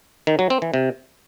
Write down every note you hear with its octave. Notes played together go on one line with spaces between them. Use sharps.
D#3
F#3
C4
E3
C3